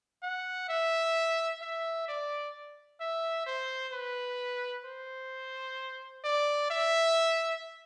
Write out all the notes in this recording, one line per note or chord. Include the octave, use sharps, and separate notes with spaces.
F#5
E5
E5
D5
E5
C5
B4
C5
D5
E5